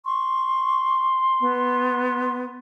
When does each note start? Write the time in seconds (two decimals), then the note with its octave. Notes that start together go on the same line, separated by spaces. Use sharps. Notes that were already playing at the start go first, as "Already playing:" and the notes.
0.05 C6 C#6
1.41 B3